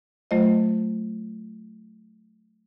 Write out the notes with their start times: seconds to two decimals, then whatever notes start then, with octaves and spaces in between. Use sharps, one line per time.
0.31 F#3 A3 F4 C5 D#5